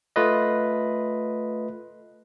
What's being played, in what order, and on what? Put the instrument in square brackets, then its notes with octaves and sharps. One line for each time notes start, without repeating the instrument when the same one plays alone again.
[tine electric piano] A3 F4 B4 D#5